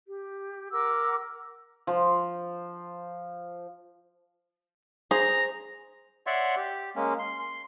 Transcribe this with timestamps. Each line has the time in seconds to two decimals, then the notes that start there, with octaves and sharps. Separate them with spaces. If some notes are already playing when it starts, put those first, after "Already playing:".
0.07 G4
0.72 A#4 F#5 D6 E6
1.87 F3 C5
5.11 G#4 C5 A#5
6.27 C#5 D5 E5 F#5 C6 C#6
6.57 G4
6.96 G#3 A#3 C#4
7.19 C6
7.39 C6